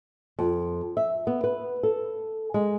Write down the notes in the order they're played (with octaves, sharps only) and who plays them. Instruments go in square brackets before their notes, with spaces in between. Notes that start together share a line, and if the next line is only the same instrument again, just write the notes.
[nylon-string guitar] F2
E5
B3
B4
A4
G#3